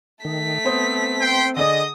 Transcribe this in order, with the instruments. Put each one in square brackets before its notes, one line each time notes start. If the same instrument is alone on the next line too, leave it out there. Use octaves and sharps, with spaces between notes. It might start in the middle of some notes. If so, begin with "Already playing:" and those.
[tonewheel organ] D#3 [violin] A3 B6
[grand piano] B3 C5 D#6 [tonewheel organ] C4
[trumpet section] G5 C6
[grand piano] D3 G#4 D5 [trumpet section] D#5 [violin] D#6